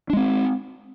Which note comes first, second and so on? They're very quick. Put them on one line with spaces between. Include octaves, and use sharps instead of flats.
D4 G#3 C4